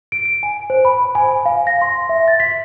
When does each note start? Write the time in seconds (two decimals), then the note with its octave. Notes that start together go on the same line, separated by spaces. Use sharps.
0.12 D7
0.25 D7
0.43 G#5
0.70 C5
0.85 B5
1.15 G#5
1.46 F5
1.67 A#6
1.82 C6
2.09 E5
2.28 A6
2.40 B6